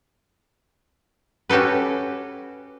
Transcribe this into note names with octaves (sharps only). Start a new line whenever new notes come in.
C#4 F#4 G4 A4 B4